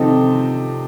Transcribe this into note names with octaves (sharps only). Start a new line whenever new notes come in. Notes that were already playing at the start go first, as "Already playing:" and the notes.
Already playing: C3 F3 C4 D#4 A4